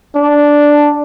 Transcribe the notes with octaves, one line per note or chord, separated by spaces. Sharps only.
D4